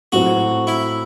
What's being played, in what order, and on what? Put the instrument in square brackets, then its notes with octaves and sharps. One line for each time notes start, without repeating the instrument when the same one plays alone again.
[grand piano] A2 F#3 C4 [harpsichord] F#4
[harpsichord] E4